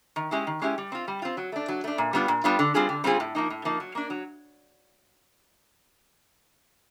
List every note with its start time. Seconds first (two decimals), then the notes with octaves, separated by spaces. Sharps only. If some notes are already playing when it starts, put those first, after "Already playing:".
0.16 D#3
0.31 G#3 C#4 E4 G4
0.47 D#3
0.62 G#3 C#4 E4 G4
0.78 G3
0.92 C4 F4
1.08 G3
1.22 C4 F4
1.37 F#3
1.52 A3 D4
1.68 F#3
1.84 A3 D4
1.98 A#2
2.13 G3 B3 D4 F4
2.28 A#2
2.44 G3 B3 D4 F4
2.59 D3
2.75 G3 C4 F4 G#4
2.89 D3
3.04 G3 C4 F4 G#4
3.20 A2
3.35 F3 A#3 D#4
3.50 A2
3.65 F3 A#3 D#4
3.80 F#3
3.95 A#3 D4
4.10 F#3